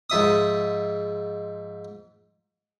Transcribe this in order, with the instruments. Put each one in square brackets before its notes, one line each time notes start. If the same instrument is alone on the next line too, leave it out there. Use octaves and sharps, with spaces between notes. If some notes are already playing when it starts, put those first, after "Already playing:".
[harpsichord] G#2 F3 E5 D#6